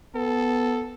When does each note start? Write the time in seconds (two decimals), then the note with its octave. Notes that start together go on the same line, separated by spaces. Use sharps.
0.15 B3 A4